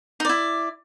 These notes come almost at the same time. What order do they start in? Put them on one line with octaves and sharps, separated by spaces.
D#4 D5 E4